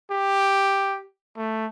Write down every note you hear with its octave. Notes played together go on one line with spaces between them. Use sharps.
G4
A3